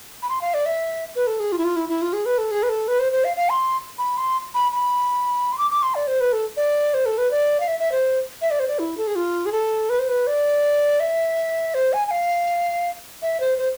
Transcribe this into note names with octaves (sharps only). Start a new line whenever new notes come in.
B5
C6
F5
D5
E5
B4
A4
G#4
F4
E4
F4
E4
E4
F4
G#4
B4
A4
G#4
B4
A4
B4
C5
C5
F5
F5
C6
B5
C6
B5
B5
C6
D6
D6
C6
D5
C5
B4
A4
D5
C5
A4
B4
D5
F5
E5
E5
C5
E5
D5
C5
D5
E4
A4
G#4
F4
G#4
A4
B4
C5
B4
D5
E5
C5
G#5
G#5
F5
E5
C5
C5